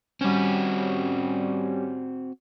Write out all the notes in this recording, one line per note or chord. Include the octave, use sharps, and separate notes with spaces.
G3 C4 C#4 F#4